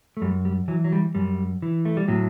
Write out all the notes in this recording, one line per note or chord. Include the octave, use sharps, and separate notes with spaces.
A3
F#2 G3
G3
E3 F#3
F#3
G3
F#2 G3
E3
A3
G3
A2 F#3